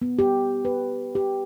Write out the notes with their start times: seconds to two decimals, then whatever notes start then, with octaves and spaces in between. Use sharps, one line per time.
0.02 B3
0.19 G4
0.65 B4
1.15 G4